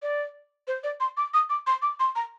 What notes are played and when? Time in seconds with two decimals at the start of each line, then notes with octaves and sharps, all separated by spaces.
0.02 D5
0.67 C5
0.84 D5
1.00 C6
1.17 D6
1.34 D#6
1.50 D6
1.67 C6
1.82 D6
2.00 C6
2.16 A#5